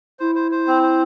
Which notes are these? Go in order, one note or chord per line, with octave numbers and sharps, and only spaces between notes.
E4 C5
C5
C5
C4
C5